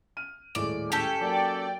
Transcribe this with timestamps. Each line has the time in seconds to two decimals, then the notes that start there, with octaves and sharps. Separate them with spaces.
0.17 F6 D#7
0.55 D#1 A2 G#3 D5
0.92 C#4 G4 A4
1.21 F#3 A#3 D5 G5